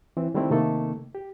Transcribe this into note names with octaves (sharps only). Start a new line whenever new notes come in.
E3 C4
D#3 G3 A3 C4 E4
C3 D#3 A3 A#3 A4
G4